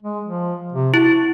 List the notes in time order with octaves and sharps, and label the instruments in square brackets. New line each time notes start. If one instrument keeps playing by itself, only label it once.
[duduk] G#3
F3
C3
[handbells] E4 [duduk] F#4